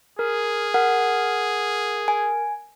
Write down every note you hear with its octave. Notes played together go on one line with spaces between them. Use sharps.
G#4 A#4
A#4 F#5
G#5